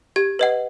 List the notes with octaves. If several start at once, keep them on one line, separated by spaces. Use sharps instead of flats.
G4 G#6
B4 D#5 F#5